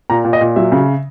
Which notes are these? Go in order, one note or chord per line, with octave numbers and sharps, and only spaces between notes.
A#2 A#5
A#2
D#5
A#2
F#3 E5
C#3